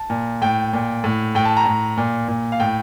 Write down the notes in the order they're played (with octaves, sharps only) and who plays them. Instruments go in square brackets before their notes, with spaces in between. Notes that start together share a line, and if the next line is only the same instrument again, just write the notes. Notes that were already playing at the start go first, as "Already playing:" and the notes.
Already playing: [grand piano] A5
A#2
A2 G5
A#2
A2
A2 G5
A5
A#5
A2
A#2
A#2
F5
A2 G5